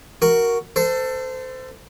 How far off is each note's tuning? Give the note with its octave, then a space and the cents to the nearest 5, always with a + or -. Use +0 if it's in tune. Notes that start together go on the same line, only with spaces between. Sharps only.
F#4 +0 A#4 +0
A4 +20 C5 -25